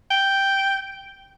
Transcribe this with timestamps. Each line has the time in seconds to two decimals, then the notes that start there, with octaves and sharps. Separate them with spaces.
0.11 G5